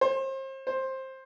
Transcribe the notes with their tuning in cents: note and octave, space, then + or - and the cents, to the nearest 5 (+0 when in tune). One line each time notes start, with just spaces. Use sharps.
C5 +35
C5 +15